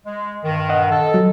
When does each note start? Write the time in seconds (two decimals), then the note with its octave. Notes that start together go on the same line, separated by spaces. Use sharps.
0.05 G#3
0.44 G2 D#3
0.69 D#5 F#5
0.91 A4
1.14 F#3